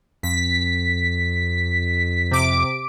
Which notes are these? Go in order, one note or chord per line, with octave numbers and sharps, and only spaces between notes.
F2 B6
C3 D6 D7